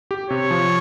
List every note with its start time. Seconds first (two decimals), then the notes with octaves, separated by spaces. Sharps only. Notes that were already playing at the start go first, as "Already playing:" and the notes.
0.11 G4
0.30 C3 C#5
0.51 F3